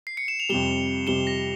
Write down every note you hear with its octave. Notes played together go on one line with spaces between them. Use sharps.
C7
C#7
E7
F7
F2 C3 G3 E7 G7
F2 C3 G3 E7 G7
A#6